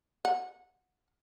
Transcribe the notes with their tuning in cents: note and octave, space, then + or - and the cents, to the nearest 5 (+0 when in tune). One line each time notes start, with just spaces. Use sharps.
F#5 -15